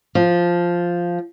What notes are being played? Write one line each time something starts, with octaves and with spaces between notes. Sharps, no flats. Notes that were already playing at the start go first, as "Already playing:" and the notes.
F3